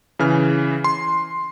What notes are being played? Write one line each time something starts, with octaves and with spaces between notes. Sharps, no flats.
C#3 E3 F6
C6